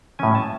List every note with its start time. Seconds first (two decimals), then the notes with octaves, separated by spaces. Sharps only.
0.19 A2 F#3 C#4 G#5
0.35 A5